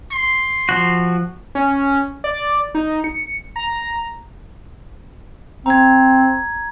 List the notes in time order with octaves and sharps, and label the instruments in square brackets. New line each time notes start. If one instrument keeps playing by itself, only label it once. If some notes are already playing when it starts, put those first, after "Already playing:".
[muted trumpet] C6
[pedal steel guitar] F3 F#4
[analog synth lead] C#4
D5
D#4
C#7
A#5
[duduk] C4 [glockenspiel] A#5 G#6